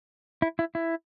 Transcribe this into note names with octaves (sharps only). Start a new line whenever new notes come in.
E4
E4
E4